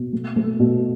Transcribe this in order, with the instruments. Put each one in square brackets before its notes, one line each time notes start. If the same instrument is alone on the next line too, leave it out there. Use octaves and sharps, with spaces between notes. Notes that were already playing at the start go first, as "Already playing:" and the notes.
Already playing: [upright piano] B2
A3
A3
B2